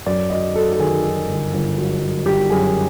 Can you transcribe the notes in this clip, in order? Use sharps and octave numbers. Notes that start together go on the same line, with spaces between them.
F#2 D5
F#3 D#5
F#3 A4
A4
D#3 G#4
F#3
G1
G1
F#3
F#3
G1 G4
F#2 G#4